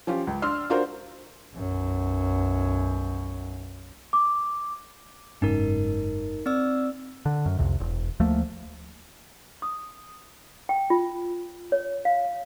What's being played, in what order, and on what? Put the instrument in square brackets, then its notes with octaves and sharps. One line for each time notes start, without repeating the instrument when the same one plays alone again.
[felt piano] F3 C#4 F4 G4
C#2
D4 C6 E6 F6
D4 F4 F#4 A#4 C5
[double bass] B1 F#2
[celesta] D6
[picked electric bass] F#1 G#2 C#4 [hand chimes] D#4 A#4
[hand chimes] C4 D5 E6
[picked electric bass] D3
F#2
C2 F2 C3
E1
D2 F3 A3 A#3
[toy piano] D#6
G5
F4
C#5
F5